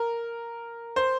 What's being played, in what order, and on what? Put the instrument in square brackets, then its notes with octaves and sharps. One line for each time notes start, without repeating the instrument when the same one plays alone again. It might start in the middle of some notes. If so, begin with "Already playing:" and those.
Already playing: [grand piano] A#4
C5